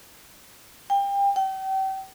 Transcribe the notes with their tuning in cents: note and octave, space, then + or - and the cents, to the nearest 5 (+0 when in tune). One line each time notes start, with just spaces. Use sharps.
G5 +30
G5 -35